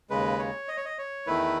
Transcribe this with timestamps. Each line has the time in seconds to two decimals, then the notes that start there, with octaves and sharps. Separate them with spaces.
0.10 D#2 C#3 G#3 B4
0.39 C#5
0.68 D#5
0.77 C#5
0.85 D#5
0.98 C#5
1.27 E2 D#3 A3 E4 B4